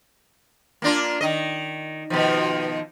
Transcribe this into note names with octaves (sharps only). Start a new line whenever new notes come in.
A#3 D4 F4
D#3 D#5
B2 D#3 F3